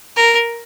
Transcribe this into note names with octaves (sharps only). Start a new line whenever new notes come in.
A#4